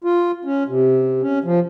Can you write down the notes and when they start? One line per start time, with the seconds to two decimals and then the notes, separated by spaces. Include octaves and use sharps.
0.04 F4
0.45 C#4
0.68 C3
1.22 C#4
1.44 F3